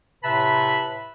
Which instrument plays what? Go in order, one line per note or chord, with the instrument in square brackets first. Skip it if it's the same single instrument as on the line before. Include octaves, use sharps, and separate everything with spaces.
[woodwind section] A2 C3 B4 E5 A5 B5